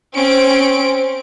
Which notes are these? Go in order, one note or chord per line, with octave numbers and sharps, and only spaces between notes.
C4 C#4 D7